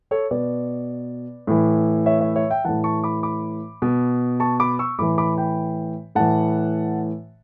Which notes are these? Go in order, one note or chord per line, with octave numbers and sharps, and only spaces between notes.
A4 C#5
B2 B4 D5
A2 E3
C#5 E5
C#5 E5
C#5 E5
E5 G5
A2 E3 F#5 A5
A5 C#6
B5 D6
B5 D6
B2
A5 C#6
B5 D6
C#6 E6
A2 E3 B5 D6
B5 D6
G5 B5
A2 E3 F#5 A5